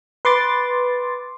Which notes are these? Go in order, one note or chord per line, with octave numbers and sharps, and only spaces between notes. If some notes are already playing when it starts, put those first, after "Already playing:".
B4 C6 D6 A6